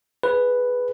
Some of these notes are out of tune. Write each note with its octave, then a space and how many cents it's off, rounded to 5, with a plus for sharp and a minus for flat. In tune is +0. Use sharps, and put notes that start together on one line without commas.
G#4 +0 B4 +0